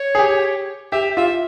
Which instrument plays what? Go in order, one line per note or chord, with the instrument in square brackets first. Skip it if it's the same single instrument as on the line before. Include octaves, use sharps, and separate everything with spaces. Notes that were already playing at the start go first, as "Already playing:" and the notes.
Already playing: [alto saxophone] C#5
[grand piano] G#4
G4
[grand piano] G4 [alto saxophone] E5
[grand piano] F4 [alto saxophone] E5